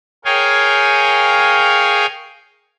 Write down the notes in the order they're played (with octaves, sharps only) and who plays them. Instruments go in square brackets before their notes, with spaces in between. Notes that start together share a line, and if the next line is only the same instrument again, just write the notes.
[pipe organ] G#4 A#4 C#5 F5 G5 G#5